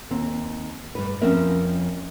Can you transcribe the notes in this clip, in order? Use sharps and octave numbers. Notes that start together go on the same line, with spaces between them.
D#2 C4
G2 B4
F2 F3 C4 C#4 A#4 E5